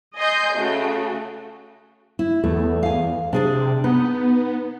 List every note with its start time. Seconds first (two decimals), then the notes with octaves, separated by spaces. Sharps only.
0.17 D#5 G#5 C6 G6
0.56 C#3 A3 F#4
2.19 E4
2.44 E2 A3
2.83 F5 G#5
3.33 C3 D4 G#4 D5
3.84 B3 D#4